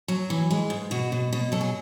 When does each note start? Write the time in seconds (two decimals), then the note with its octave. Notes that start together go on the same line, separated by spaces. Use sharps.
0.08 F#3
0.30 E3
0.51 G#3
0.70 G#2
0.91 B2 F#4
1.12 B2
1.33 B2
1.52 F#3 A4
1.61 G#4